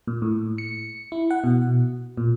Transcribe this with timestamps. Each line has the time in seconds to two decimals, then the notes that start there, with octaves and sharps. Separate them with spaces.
0.07 A#2
0.22 A2
0.58 C#7
1.12 E4
1.31 F#5
1.44 B2
2.17 A#2